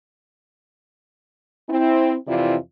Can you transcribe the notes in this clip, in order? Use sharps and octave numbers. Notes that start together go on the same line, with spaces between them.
C4 E4
F2 C3 E3 E4 F4 D5